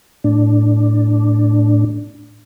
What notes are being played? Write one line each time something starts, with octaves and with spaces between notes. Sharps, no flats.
A2 D4